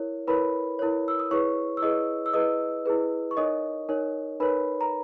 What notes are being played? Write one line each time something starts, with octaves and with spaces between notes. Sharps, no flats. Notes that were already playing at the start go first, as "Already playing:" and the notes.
Already playing: E4 A#4 C#5
E4 A#4 B4 C#5 B5
E4 A#4 C#5
E6
D#6
E4 G#4 B4 C#5 C#6
E6
E4 G#4 B4 D#5 D#6
E6
E4 G#4 B4 D#5 D#6
E4 G#4 B4
C#6
D#4 A#4 C#5 D#5 D#6
D#4 A#4 C#5
D#4 A#4 B4 C#5 B5
A#5